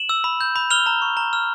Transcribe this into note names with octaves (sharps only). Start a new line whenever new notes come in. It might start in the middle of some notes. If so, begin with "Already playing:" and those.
Already playing: E7 F#7
E6
B5
G6
B5
F6 F7 G7
A#5
C#6
A#5
F6